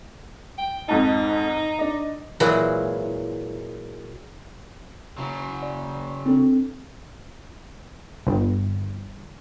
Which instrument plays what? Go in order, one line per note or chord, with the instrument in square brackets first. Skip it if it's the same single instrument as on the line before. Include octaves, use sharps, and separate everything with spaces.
[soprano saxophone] G5
[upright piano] F2 G#2 A5 [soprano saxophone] D#4
[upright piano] D4 D#5
[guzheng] A#2 E3 F#3 G#3 E4
[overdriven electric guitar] C#3 F#3
[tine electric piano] D5
C4 D4 A4
[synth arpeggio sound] G1